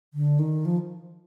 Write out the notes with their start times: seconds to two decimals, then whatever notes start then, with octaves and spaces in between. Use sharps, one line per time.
0.14 D3
0.39 D#3
0.65 F3